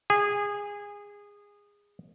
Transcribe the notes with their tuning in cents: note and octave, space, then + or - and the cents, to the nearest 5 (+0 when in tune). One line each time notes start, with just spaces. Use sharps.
G#4 -20